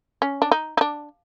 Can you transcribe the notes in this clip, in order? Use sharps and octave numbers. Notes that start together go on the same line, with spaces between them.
C#4
D4
D#4
D#4
D4